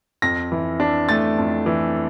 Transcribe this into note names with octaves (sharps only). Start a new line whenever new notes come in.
F2 A#6
E3
D4
A3 A6
F2
E3